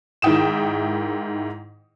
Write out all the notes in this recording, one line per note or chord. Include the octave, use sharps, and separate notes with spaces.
G#2 D#3 E4 G5 D#6 E7